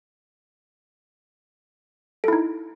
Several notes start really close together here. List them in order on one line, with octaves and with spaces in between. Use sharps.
A4 E4 D#4